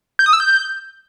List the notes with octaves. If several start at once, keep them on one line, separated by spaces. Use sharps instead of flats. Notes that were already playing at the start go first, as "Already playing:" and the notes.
G6
D#6
E6
G6